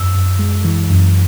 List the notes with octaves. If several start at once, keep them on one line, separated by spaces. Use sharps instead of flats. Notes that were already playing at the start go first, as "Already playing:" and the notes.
Already playing: F#2 E6
F#2
G#3
E3
F#2